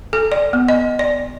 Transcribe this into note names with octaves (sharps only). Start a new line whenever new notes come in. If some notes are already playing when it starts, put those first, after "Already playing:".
A4
D5
B3
D#5
D5